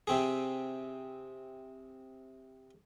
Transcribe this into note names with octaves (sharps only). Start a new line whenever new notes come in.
C3 C4 G#4